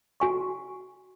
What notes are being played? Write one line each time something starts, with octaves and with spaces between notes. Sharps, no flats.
F#4 G#5 C#6